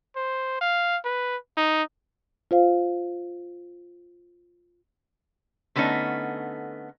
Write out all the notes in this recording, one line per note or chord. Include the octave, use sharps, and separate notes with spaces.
C5
F5
B4
D#4
F4 C5 F5
D3 A3 B3 C#4 D#4